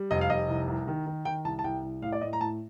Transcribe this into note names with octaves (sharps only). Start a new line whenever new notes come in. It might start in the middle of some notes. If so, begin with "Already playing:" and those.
Already playing: G3
F1 D#5
F5
F1 D#5
C2
C2
D#3
D#3
D#3 G5
C2 A5
A5
C2 G5
C2
A2 F5
D5
A2 D#5
A#5
A2 A5